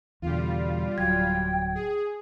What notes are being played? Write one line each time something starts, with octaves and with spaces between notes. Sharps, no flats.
E2 B2 D3 G3 F4
D1 F#3 G5 G#6
G#4